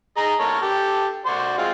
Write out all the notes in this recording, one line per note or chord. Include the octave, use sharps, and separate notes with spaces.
G#4 D#5 A#5
A4 A#4 C#5
G4 A4
F#4 C5 D5
G#3 C4 F4